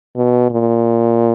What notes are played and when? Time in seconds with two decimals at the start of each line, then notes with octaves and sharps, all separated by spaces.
0.16 B2
0.50 A#2